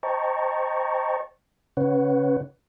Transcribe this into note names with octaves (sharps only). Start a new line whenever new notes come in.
C5 D#5 G5 A5 A#5 C#6
C#3 C#4 B4 C#5 F#5